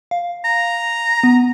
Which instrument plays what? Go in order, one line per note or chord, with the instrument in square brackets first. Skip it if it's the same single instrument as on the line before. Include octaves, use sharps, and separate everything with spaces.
[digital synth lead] F5
[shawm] A#5
[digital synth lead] B3